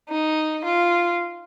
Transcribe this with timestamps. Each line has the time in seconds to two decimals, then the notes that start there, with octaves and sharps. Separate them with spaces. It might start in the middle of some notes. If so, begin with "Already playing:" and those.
0.09 D#4
0.64 F4